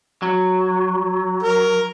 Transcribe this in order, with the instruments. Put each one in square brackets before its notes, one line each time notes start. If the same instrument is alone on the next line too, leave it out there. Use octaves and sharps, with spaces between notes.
[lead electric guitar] F#3
[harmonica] A#4